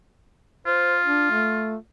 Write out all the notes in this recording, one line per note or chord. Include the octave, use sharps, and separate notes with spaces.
F4 C5
D4
A3